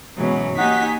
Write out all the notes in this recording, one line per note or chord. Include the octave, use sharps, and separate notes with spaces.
G#2 B2 E3 F#3 C#4
A#3 D#4 F#4 G4 G#5 B6